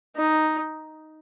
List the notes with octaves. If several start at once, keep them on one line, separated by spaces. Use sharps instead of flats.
D#4